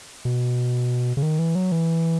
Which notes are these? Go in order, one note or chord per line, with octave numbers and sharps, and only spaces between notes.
B2
C#3
D#3
E3
F#3
E3